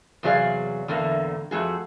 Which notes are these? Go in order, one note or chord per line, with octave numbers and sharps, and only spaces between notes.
E2 C3 F#3 G#4 D5 F5
E2 A2 D3 A3 A#3
F2 A3 F#4 G#4